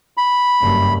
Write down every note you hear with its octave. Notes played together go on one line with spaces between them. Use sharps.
B5
F#1 G2